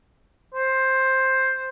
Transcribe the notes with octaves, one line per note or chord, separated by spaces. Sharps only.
C5